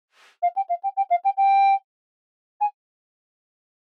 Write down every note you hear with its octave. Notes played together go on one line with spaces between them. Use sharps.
F5
G5
F5
G5
G5
F5
G5
G5
G#5